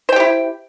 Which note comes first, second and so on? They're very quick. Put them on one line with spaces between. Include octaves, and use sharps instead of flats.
C5 G5 G4 E4